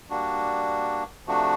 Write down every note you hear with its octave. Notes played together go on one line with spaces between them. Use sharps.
G3 A#3 D4 F#4
C3 F3 A3 D4 F#4